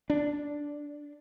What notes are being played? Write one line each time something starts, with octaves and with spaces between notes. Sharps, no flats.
D4